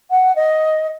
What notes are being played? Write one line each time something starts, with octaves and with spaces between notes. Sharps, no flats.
F#5
D#5